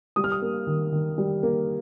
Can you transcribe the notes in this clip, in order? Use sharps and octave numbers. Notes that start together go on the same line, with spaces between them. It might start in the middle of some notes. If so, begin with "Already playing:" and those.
G3 D#6
F6
D#6
A#3
D#3
D#3
G3
A#3